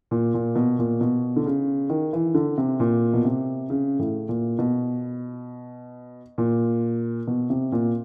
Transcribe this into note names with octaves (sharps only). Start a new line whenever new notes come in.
A#2
A#2
B2
A#2
B2
D3
C#3
D#3
E3
D3
C3
A#2
B2
C3
C#3
A2
A#2
B2
A#2
B2
C3
A#2